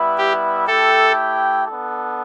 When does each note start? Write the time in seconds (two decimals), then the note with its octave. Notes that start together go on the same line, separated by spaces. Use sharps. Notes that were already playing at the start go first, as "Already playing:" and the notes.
Already playing: G3 B3 E4 B4 E5
0.18 G4
0.67 A3 E4 G4 A4 E5 G5
1.67 B3 D4 A4